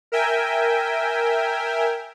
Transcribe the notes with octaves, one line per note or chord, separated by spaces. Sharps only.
A#4 E5 G5 G#5